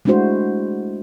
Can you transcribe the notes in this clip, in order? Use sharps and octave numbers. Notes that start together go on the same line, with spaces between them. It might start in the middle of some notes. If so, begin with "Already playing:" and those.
G#3 A3 D4 E4 F#4 C5